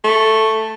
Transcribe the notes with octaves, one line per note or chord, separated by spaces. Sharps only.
A3